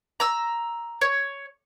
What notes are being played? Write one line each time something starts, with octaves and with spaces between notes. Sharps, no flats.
A#5 E6
C#5